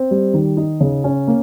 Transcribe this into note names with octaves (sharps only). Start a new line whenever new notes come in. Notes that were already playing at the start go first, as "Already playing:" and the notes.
Already playing: C4
G3
D#3
D#4
C#3
C#4
A#3